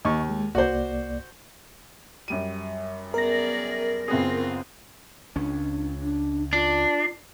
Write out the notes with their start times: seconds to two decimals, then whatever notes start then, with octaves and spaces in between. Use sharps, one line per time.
0.05 D#2 D#5 C#6
0.30 G#3
0.55 C2 A#3 F#4 C5 D5
2.28 F#2 G3 D#7
3.14 B3 G#4 A#4 D5 A#6
4.08 F#1 B3 C4 F4 G#4
5.36 C#2 C#4 D4
6.02 D4
6.53 D4 F4